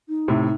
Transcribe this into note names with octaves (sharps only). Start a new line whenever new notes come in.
D#4
A2 C3